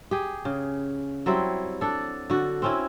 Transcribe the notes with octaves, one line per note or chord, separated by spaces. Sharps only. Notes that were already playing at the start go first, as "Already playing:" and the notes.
G4 G#4
C#3
F#3 G3 C4 E4
D4 A4
D3 F#4
C4 C#4 E4